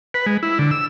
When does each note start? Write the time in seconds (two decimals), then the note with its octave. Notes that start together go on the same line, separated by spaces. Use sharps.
0.14 B4
0.26 G#3
0.43 E4
0.59 D3
0.71 E6